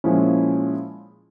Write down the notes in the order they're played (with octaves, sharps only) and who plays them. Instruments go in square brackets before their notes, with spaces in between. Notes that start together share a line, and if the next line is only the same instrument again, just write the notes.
[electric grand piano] A#2 F3 G#3 C#4 E4